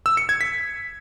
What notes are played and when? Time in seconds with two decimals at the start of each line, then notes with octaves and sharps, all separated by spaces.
0.06 E6
0.17 C#7
0.29 G#6
0.41 B6